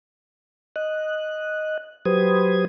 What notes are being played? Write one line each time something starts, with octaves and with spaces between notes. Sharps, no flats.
D#5 F#6
F#3 G4 B4 C5 D#6 G#6